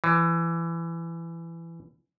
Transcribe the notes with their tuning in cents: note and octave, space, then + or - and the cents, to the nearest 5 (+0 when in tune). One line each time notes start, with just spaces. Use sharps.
E3 +20